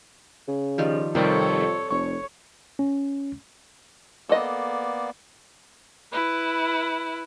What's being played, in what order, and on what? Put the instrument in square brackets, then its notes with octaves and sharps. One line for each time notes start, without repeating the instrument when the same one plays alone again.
[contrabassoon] C#3
[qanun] D#3 F3 G3
[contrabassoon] F2 [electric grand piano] C3 D#3 G3 [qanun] C4 D5 [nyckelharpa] A4 C#5
[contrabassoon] F1 [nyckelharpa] C#5 [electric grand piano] C#6
[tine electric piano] C#4
[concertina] A#3 B3 D5 [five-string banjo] A4 D#5
[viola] E4 B4